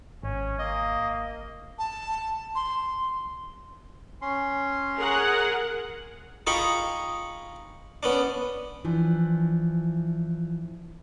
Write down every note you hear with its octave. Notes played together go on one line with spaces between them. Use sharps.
G#1 C#4
A#3 D#5
A5
C6
C#4 C6
G#4 A#4 F#5
D#4 F4 G#4 G5 B5 C#6
B3 C#4 D4
E3 F3 D4